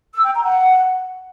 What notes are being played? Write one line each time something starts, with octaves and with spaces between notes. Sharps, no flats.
E6
G5
A#5
F#5